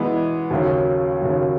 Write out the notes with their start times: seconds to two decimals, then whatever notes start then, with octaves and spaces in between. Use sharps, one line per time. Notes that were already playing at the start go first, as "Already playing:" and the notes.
Already playing: E3 G#3 B3
0.50 D#2 C#3 F#3
1.21 D#2 C#3 F#3